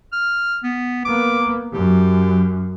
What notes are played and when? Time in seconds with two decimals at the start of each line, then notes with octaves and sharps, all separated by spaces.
0.13 F6
0.63 B3
1.05 A#3 B3 D6
1.73 F#2 G4